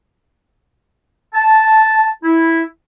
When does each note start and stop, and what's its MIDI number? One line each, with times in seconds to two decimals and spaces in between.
1.34 2.08 81
2.23 2.61 64